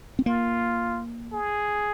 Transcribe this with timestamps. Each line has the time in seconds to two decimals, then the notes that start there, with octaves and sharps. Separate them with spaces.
0.19 C4
0.26 A#3 F4
1.33 G#4